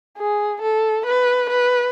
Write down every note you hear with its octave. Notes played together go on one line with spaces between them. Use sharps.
G#4
A4
B4
B4